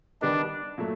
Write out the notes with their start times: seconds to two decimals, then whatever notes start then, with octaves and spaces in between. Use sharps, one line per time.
0.21 D#3 G3 B3 D4 D#4
0.78 A#2 F#3 A3